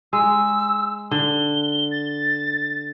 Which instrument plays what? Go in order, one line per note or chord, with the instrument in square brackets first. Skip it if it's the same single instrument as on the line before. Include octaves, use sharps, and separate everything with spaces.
[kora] G#3 [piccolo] E6
[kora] D3 [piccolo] G7
[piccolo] A6